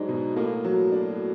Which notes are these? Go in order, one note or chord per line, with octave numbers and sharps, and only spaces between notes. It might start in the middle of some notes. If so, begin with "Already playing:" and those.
Already playing: G#2 F#3 D4
B2
A2 A#3
F#3
D4